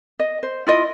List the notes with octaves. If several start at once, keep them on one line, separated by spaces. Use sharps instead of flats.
D#5
C5
E4 F4 D#5